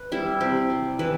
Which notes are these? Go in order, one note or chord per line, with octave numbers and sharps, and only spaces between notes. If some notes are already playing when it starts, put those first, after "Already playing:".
Already playing: B4
G3 E4
C3 G4
G3
E3 B4